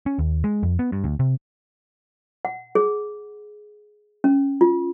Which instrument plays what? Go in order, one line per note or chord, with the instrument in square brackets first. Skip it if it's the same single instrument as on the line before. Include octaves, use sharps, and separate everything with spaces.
[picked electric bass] C#4
D#2
G#3
F2
B3
G2
D2
C3
[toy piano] F#5
G#4
C#4
F4